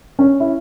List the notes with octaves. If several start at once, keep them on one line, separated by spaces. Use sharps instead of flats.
C#4
E4